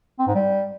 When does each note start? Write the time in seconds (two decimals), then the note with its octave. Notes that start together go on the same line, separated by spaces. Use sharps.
0.19 C4
0.27 G#2
0.35 G3